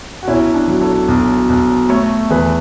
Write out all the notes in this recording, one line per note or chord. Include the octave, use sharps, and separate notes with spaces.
F#4
B1 C#4 E4
D4
F#3
A4 C#5
B1
B1
A3 A4 C#5
E2 G#4 B4